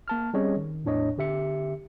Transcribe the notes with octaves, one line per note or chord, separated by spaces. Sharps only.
A#3 A5 F6
G3 C4 C#4 G#4 C#5 D#5
D#3
E2 A2 D4 C#5 D#5
D3 G4 E5 C#7